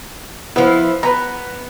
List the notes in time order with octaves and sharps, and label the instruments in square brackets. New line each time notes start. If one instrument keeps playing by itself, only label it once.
[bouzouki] F3 E4 [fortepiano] B3
[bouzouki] B3 [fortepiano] B4 A#5